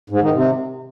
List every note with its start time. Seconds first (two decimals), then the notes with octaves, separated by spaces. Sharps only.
0.10 G#2
0.22 D#3
0.33 C3